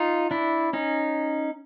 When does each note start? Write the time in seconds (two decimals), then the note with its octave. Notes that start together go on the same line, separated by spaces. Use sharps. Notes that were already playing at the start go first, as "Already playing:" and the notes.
Already playing: D#4 F4
0.31 D4 E4
0.73 C#4 D#4